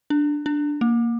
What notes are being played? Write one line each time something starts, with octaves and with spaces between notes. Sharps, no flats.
D4
D4
A#3